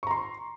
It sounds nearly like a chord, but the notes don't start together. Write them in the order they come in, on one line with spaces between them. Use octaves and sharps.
C#6 A#5 C6